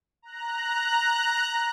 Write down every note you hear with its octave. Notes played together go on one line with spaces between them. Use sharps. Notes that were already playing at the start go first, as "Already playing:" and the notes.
A#5 F#6